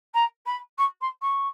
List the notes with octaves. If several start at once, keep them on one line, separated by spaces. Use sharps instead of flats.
A#5
B5
C#6
C6
C#6